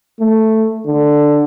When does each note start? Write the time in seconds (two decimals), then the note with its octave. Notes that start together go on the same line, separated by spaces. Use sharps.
0.20 A3
0.87 D3